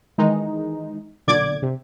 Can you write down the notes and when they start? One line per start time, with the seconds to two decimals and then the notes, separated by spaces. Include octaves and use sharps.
0.18 D#3 E3 G#3 D#4
1.27 B1 A#2 D3 D5 D6 G#6
1.62 C3